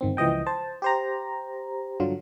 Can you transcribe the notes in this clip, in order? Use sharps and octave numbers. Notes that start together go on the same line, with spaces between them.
G1 D#3 C4
C#2 E3 F3 D#5 G5
C5 A5
G4 C5 A#5
G2 D3 F#3 F4